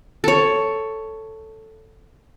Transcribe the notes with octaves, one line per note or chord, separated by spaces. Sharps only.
A4 C#5